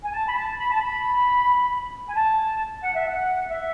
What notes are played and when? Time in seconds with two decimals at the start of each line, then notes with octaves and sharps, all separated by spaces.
0.04 G#5
0.14 A5
0.29 B5
0.37 A5
0.59 B5
0.72 A5
0.81 B5
2.09 G#5
2.17 A5
2.83 F#5
2.95 E5
3.07 F#5
3.50 E5